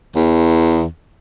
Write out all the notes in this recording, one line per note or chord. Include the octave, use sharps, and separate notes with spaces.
E2